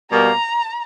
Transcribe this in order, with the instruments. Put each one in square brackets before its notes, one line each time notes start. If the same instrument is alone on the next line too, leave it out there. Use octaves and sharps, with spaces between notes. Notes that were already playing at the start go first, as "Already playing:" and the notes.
[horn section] B2 G3 A#3 [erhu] A#5